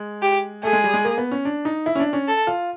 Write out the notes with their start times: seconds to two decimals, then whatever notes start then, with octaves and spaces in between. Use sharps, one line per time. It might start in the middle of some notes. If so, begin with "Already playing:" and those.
Already playing: G#3
0.22 G4
0.63 A3 G#4
0.73 G#3
0.84 G3
0.94 G#3
1.05 A#3
1.18 B3
1.31 C#4
1.45 D4
1.65 D#4
1.86 E4
1.95 C#4
2.00 D4
2.13 C#4
2.28 A4
2.47 F4